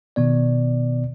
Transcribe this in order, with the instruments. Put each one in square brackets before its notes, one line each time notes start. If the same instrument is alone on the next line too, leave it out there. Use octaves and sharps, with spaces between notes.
[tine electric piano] B2 D#3 B3 D5